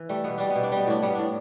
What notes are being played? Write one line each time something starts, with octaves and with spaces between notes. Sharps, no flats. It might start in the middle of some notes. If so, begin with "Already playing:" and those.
Already playing: E3
G3 A3
B2 B3
G3 D4
B3
B2
D4
G3 B3
A2 D4
G3 B3
A2 D4